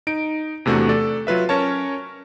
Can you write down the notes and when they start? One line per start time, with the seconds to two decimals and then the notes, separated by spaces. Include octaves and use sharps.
0.07 D#4 D7
0.66 E2 C3 A3 D4 F#4
0.89 A4 D5
1.27 F#3 F4 B4 E5
1.49 C#4 A#4 C#5 A5